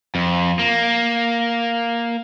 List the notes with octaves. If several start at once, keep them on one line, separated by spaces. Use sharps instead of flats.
F2
A#3